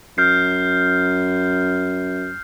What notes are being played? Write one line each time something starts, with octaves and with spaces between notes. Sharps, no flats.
F#2 F6 G6 C7